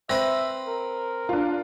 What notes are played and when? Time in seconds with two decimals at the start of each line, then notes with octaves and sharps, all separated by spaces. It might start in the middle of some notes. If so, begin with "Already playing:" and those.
0.09 C4 B4 E5 A#6
0.67 A#4
1.29 D4 F4